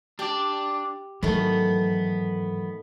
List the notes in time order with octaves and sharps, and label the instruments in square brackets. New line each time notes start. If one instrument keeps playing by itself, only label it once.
[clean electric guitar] D4 D5 [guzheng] G4
[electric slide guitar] G#2 [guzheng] D#3 A3 [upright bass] E3 F#3 [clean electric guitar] B3